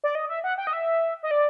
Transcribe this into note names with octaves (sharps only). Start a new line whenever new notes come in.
D5
D#5
E5
F#5
G5
D#5
E5
D#5
D5